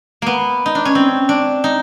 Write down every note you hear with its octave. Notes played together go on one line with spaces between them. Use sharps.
A#3 B3
D#4
D4
C#4
C4
D4
D#4